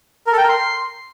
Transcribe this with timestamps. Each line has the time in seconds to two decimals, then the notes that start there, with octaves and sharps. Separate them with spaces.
0.27 A#4
0.32 A4
0.38 G5
0.43 A#4
0.49 C6